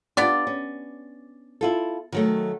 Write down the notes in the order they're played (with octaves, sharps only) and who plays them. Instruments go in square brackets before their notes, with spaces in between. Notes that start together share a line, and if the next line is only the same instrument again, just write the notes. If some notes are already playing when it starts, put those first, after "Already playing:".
[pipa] B3 G4 D5 [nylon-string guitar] D4 F4
[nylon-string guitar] C#4
E4 F4 A4
D#3 F#3 A3